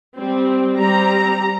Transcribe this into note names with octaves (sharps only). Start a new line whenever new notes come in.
G3 C4
G3 C4 A#5